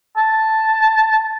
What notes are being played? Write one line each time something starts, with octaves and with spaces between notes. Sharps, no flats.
A5